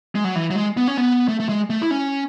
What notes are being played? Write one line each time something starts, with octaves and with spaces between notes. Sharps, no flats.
G#3
F#3
E3
F#3
G#3
B3
C#4
B3
A3
A3
G#3
A3
E4
C#4